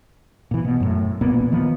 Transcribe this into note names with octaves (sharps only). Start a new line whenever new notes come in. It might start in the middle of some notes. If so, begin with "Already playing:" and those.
A#2 E3
B2
F#2 A2
E1 A#2 A#3 B3
D#3 F3 B3